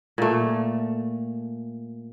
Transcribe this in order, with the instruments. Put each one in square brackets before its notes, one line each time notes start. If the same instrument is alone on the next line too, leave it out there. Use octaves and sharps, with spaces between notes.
[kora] A#2 A3